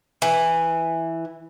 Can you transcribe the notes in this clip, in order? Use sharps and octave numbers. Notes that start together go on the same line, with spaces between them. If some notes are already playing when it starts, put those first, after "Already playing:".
E3